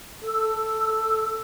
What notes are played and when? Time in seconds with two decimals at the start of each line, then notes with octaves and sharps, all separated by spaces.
0.24 A4 E6